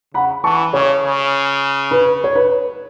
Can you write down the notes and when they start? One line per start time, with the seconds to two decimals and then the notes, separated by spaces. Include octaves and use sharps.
0.14 C#3 F#5 B5
0.44 E3 A5 C#6
0.73 C#3 C#5
1.03 C#3
1.91 B4
2.24 C#5
2.35 B4